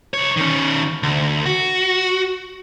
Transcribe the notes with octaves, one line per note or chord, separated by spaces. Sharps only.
C2 C#5
D#3 C#4
D2
F#4